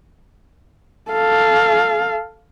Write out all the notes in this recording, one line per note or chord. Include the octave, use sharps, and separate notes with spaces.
A4 F5